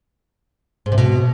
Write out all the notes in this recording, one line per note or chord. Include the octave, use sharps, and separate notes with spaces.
G#2
C3
B2